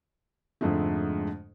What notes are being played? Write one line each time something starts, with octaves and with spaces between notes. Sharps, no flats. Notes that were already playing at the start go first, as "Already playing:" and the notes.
F2 G#2 D3 G#3 A3